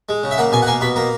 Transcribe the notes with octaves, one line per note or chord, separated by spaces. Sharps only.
G#3
C#3
E5
A#3 F#5
B2 G#5
F#5
A#3 G#5
B2 B5
A#3 A#5